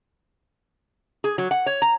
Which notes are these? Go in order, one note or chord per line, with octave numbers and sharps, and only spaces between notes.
G#4
F#3
F#5
C#5
A#5